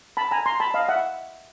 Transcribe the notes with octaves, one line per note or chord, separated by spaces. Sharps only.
A5 B5
G#5 A#5
A#5 C6
A5 B5
D#5 F5
E5 F#5